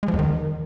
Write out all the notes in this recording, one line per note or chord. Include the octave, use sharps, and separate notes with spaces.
G#3
F3
E2
D#3